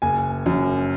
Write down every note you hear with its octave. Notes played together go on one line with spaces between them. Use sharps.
F#1 G#5
F#2